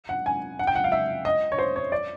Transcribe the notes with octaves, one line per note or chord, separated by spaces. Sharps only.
F#5
G#5
F#5
G5
F#5
F5
E5
D#5
C#5
C5
C#5
D5